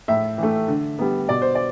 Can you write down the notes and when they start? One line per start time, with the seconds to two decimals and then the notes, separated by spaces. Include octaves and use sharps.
0.08 A2 E5
0.38 E3 A3
0.68 D3
0.99 G3 B3
1.29 B2 D5
1.42 C5
1.55 D5